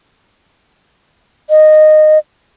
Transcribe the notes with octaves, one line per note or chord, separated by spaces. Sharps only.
D#5